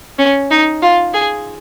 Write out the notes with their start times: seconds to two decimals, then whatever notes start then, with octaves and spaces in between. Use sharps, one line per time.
0.19 C#4
0.51 D#4
0.82 F4
1.14 G#4